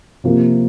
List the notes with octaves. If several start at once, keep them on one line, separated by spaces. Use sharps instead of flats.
C3 F3 A#3